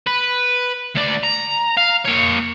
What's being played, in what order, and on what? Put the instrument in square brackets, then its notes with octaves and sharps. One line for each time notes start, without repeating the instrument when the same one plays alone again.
[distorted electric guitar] B4
D2 D5
A#5
F5
A#3 C#5